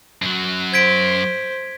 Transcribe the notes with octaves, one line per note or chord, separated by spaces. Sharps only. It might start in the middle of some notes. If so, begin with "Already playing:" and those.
F#2 F#3
C5 G#6 B6 D7